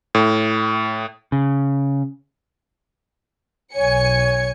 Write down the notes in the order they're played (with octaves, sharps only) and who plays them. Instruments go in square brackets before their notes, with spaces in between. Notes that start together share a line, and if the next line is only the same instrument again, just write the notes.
[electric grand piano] A2
[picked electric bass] C#3
[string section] B1 G#5 C#7 [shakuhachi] C#5